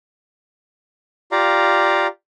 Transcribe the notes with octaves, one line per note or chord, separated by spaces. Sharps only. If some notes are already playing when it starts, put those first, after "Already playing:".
F4 G4 D5 F5 A#5